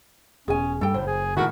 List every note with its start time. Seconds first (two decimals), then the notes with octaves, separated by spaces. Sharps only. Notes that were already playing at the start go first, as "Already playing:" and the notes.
0.48 E1 C#4 G#4 G#5
0.81 G2 G3 A4 G5
0.94 F#1 A2 C5
1.07 G#4
1.37 A2 D#3 E4 F#4 A#4 A5